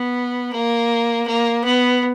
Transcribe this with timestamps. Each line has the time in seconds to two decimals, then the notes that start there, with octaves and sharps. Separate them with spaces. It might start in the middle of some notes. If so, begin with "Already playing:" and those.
Already playing: B3
0.53 A#3
1.27 A#3
1.64 B3